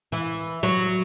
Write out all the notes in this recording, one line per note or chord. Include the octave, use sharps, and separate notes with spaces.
E3
F#3